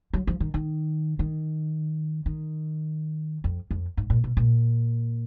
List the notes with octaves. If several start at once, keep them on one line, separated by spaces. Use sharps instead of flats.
F#3
F3
D#3
D#3
D#3
D#3
F2
F2
G#2
A#2
B2
A#2